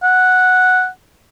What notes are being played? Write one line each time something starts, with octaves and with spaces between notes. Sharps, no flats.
F#5